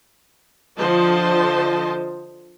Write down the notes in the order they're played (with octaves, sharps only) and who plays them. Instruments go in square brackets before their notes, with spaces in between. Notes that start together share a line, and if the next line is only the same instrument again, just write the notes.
[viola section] D3 F3 C5 D#5 A5